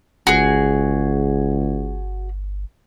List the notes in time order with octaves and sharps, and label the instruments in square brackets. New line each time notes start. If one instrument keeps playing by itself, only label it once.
[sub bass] G1 [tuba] C#2 [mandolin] F#4 G#4